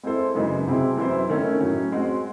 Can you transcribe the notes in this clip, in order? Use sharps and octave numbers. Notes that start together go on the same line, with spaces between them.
G#3 C4 E4 A4 C5
F#2 C#3 E3 G#3 D#4
C3 F#3 C4 E4 G#4
F#2 E3 C4 E4 C5
D#3 A3 C#4 E4
A2 F#3 C#4
G#3 C4 F#4